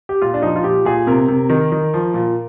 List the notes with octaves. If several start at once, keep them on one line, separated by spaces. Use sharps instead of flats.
G4
A#2 F4
D4
F3 D#4
F4
A#2 G4
A#2 G#4
C3 A#4
C3
D#3
D#3
F3
A#2